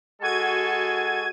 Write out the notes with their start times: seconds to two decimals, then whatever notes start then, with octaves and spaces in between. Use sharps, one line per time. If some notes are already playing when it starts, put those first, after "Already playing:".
0.22 G#3 F#4 A4 G#6 D#7